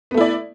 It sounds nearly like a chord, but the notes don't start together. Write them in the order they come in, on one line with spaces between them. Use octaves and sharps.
B3 A3 E4 D5